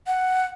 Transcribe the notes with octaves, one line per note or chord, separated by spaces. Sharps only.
F#5